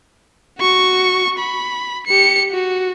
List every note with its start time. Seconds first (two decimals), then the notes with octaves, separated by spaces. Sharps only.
0.59 F#4 C#6
1.38 B5
2.07 G4 C#7
2.52 F#4